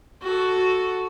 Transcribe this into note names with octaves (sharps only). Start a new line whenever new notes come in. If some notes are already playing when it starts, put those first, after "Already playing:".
F#4 A4